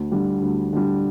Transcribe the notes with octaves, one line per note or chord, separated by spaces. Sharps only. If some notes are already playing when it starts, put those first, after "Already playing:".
Already playing: D2
D3 G3
D2
D3 G3